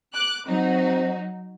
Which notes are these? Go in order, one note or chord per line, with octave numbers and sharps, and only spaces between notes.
D6 F#6
F#3 C4 D#4 F#4